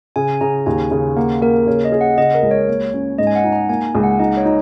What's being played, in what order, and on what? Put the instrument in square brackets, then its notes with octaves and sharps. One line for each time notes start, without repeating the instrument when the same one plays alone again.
[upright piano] C#3 [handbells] G#5
[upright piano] C#3 [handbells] A#5
[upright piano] D#2 [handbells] G#5
[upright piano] C#3
[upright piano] A#3 [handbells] F#5
[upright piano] A#3 [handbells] A#4
[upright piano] C#3 [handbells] C#5
[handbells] D#5
[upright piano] G#4
[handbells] F#5
[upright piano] C#3 [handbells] D#5
[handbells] A#4
[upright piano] C#2
[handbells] C#5
[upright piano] A#3
C#4
[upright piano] G#2 [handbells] D#5
[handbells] G#5
F#5
[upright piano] D#4
[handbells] A#5
[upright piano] A#3 [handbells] G#5
[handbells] G#5
[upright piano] C#2
[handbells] F#5
[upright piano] D#4 [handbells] D#5
[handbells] C#5
[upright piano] D#4